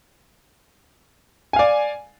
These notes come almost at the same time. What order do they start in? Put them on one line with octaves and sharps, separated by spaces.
G#5 F5 D5